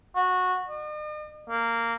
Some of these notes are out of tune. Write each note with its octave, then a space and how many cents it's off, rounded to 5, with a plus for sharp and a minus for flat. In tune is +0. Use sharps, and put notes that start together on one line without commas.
F#4 -15
D#5 -45
A#3 -15